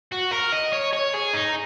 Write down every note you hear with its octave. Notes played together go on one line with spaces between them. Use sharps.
F#4
A#4
D#5
C#5
C#5
G#4
D#4